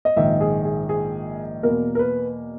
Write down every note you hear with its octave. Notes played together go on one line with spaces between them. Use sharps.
D#5
A#1 G#2 D#3 E5
G#4
G#4
G#4
E2 B2 A#3 A#4
A#4
B4